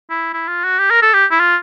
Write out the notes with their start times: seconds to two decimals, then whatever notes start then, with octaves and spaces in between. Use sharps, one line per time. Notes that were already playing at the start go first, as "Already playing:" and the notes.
0.10 E4
0.34 E4
0.48 F4
0.64 F#4
0.79 G4
0.90 A#4
1.02 A4
1.14 G4
1.31 E4
1.40 F4